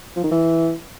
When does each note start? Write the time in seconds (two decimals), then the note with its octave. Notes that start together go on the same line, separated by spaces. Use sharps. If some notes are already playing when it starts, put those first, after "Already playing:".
0.16 F3
0.24 D#3
0.31 E3